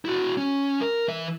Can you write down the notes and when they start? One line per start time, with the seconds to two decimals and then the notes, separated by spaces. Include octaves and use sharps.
0.05 E4 F#4
0.37 C#4
0.81 A#4
1.08 E3 E5